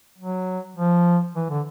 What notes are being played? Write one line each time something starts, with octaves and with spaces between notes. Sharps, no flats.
F#3
F3
E3
D3